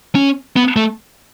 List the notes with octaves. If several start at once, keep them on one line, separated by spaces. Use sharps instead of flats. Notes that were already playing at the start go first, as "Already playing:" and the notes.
C#4
B3
A3